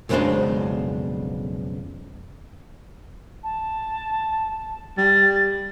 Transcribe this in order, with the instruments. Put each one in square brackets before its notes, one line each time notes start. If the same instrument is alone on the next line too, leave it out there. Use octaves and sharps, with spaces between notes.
[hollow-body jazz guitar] B1 F2 C#3 G#3 D4 C5
[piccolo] A5
[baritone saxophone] G3 [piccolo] A6